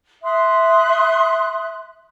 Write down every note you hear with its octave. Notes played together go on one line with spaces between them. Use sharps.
E5 C6 D#6 F#6